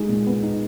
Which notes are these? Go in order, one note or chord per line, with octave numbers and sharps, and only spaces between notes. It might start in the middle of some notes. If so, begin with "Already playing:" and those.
Already playing: G#3 D#4
A#2
B3
D#4